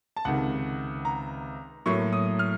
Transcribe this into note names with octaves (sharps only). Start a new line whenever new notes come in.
A5
C#2 C3 D#3 F#5
A#5
A2 F#3 A#3 C#6
D#6
F6